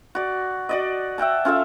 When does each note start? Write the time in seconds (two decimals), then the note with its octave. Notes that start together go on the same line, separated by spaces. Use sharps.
0.15 F#4 D5
0.69 F#4 D5 D#5
1.18 E5 F#5 G5 A5
1.45 C#4 F4 A4 E5